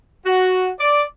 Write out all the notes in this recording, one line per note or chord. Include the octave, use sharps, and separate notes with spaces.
F#4
D5